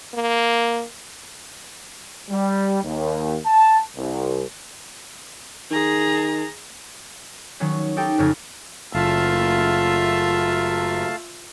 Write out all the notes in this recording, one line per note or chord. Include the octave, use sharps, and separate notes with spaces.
A#3
G3
D#2
A5
C2
D#3 G#4 A#5
D#3 F#3 C#4
D#4 G4 A4 G5
F2 C#3 A4 A#4 G#6
F#1 A3 F4 E5 F5 A5